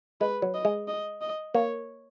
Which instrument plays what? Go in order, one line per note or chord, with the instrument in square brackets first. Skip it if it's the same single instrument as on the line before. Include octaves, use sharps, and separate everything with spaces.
[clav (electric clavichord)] G#3 [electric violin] B4
[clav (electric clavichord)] F#3
[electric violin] D#5
[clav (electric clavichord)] G#3
[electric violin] D#5
D#5
[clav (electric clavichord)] A#3 [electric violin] C#5